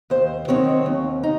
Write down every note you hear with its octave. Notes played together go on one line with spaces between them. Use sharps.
D#2 C5
D#3 F#3 C4 D#4 C#5
D#2
D#4